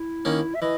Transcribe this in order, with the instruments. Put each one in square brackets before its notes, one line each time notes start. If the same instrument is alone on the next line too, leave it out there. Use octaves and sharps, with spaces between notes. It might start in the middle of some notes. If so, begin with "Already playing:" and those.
Already playing: [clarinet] E4
[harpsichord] D#3 A#3 C#4
[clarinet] E5
[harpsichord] E3 [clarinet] D#5